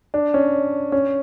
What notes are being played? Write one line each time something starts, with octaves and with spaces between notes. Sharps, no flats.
D4
C#4
C#4